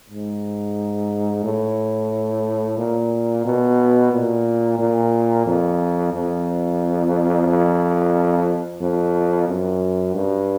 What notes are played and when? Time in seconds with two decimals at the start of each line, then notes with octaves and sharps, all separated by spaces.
0.10 G#2
1.44 A2
2.78 A#2
3.45 B2
4.12 A#2
4.79 A#2
5.46 F2
6.13 F2
7.47 F2
8.81 F2
9.48 F#2
10.15 G2